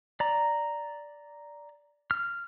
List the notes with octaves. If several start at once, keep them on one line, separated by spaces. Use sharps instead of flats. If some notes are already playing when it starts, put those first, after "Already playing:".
D5 A#5
F6